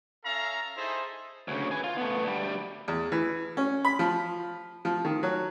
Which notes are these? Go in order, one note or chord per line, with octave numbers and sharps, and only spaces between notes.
C#4 A4 E5 F5 A#5
D#4 E4 G#4 A4 C5
D2 C#3
B4 G#5
F4
A3 B3
D2 G3
E2
E3
C#4
B5
F3
F3
D#3
F#3